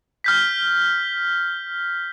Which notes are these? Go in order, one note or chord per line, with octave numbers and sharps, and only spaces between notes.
F6 G6 B6